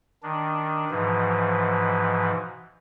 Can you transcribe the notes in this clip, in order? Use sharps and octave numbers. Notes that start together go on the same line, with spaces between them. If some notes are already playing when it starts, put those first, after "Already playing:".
D#3 D4
G#2 B2 E3 F3